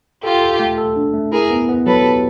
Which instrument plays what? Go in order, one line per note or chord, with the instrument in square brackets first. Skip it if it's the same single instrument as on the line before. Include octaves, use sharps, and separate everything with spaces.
[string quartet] F4 G4 [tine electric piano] A4
[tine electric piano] A4
A3
A4
D4
A3
[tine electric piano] E4 [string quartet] G#4 A#4
[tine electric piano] B3
B3
[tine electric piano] F#3 [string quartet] A4 B4
[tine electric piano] G4